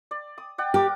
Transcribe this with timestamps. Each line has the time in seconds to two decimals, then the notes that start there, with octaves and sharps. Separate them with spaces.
0.11 D5
0.38 D#6
0.58 D5 F#5 G5
0.74 G4 A#4 D6